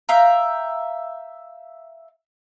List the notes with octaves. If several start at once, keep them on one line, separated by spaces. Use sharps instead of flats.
E5 F5 G5 A#5